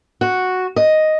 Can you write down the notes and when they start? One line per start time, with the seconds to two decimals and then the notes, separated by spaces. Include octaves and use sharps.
0.21 F#4
0.76 D#5